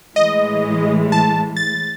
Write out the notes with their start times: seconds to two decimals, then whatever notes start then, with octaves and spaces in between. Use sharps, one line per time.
0.16 A2 E3 G#3 D#5
1.12 A5
1.57 A6